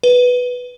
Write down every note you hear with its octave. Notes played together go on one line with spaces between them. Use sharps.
B4